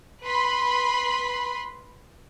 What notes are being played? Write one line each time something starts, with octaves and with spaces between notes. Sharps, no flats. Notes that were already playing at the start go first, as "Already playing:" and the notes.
B4 B5 C6